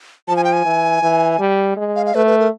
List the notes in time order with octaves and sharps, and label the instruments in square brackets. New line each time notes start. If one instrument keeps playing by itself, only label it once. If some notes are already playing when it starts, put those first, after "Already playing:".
[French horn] F3 [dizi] A5
[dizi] G#5
G5
G#5
[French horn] E3
E3
G3
G#3
[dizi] F5
F5
[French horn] A3 [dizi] B4
[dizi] B4
A#4